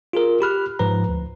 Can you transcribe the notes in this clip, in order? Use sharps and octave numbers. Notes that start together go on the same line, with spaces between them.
F4 G#4 A#4
G4 B5 F6 F#6
G#2 F3 B4 A#5
D2